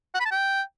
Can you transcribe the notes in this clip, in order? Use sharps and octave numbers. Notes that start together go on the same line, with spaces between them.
F#5
B5
A5
G5